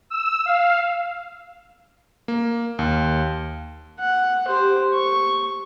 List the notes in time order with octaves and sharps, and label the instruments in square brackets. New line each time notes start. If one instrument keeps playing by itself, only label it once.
[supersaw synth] E6
F5
[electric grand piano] A#3
D#2
[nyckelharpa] F#5
G4 C5
C#6